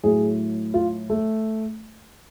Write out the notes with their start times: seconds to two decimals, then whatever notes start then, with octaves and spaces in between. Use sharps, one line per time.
0.04 A2 F#3 G#4
0.74 F4
1.10 A3